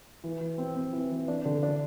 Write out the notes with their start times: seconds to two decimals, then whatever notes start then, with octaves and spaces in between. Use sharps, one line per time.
0.24 E3
0.41 E3
0.58 C4
0.75 C4
0.93 E3
1.11 E3
1.28 D4
1.45 D3
1.63 D4